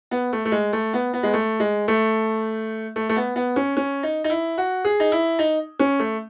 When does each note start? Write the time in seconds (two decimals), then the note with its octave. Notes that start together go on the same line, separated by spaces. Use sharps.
0.11 B3
0.33 A3
0.45 A3
0.52 G#3
0.73 A3
0.93 B3
1.13 B3
1.23 G#3
1.34 A3
1.60 G#3
1.88 A3
2.96 A3
3.09 A3
3.16 B3
3.36 B3
3.56 C#4
3.77 C#4
4.03 D#4
4.24 D#4
4.30 E4
4.58 F#4
4.85 G#4
5.00 D#4
5.12 E4
5.39 D#4
5.79 C#4
6.00 A3